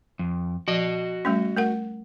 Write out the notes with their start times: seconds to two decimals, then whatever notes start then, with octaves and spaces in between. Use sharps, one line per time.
0.19 F2
0.68 F3 F#4 D#5
1.25 G3 A3 C#4
1.57 A3 A#4 F#5